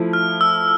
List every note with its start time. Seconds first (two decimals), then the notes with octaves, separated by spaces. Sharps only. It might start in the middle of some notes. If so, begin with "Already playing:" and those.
Already playing: F3 A3 E4
0.13 F6
0.41 E6